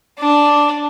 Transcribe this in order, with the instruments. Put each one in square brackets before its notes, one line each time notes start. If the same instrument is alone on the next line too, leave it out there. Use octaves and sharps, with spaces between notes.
[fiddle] D4